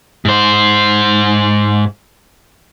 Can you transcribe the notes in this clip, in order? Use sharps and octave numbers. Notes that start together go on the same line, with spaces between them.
G#2 C5